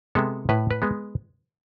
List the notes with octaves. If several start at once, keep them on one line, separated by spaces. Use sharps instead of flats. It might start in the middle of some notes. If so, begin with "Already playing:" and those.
C3 G#3 B3 A4
A2 B4
B4
G#3 B3